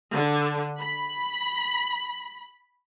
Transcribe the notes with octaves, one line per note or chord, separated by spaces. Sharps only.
D3
B5